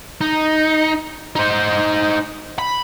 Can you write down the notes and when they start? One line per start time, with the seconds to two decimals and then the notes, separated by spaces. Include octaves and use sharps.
0.21 D#4
1.36 D#4 C5
2.58 B5